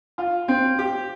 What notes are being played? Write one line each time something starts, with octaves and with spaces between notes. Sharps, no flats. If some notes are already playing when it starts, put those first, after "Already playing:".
F4
C4
G4